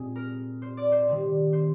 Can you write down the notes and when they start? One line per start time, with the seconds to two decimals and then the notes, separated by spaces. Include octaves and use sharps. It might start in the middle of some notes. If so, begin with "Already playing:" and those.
Already playing: A#2 G#3 C4 G#4
0.16 A#4
0.62 C5
0.77 D5
0.92 C5
1.08 D#3 G3 C4
1.53 C5